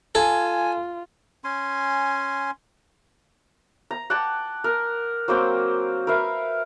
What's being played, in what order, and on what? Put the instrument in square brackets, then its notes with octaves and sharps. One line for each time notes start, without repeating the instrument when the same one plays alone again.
[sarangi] F4 [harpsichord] A4 [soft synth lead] G#5
[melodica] C#4 G#5 C6
[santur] A#5
F#5 G5 A5 D6
A#4
F#3 A#3 C4 G5
A#4 B4 E5 F5